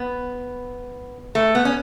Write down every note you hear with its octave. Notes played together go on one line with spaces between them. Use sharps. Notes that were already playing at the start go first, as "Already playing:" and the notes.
Already playing: B3
A3
B3
C#4